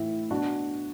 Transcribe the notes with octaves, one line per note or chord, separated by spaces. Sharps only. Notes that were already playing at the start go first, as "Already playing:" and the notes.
Already playing: A2 E3 E4
B2 D4 F#4